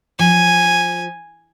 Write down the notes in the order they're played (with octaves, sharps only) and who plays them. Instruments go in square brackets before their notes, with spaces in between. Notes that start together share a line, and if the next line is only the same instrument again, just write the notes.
[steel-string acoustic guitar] F3 [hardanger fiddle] G#5